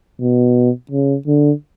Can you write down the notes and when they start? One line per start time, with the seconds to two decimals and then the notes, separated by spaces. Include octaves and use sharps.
0.21 B2
0.91 C#3
1.27 D3